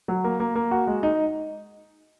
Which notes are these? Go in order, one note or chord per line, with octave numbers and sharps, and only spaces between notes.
F#3
A#3
A#3
A#3
F#4
G#3
D#4